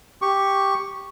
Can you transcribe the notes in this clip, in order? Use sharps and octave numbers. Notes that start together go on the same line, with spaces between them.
G4 C#6